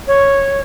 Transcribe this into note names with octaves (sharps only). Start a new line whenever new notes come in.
C#5